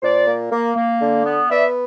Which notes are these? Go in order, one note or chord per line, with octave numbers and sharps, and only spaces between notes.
A#2 C5 D5
A#3
A#3
A#3
D3
B3
B3 D5 E5